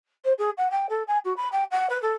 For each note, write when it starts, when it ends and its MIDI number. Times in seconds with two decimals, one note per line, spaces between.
0.25 0.33 72
0.38 0.50 68
0.58 0.68 78
0.71 0.87 79
0.90 1.03 69
1.08 1.18 80
1.25 1.33 66
1.37 1.49 83
1.52 1.64 79
1.71 1.87 78
1.90 2.00 71
2.02 2.13 69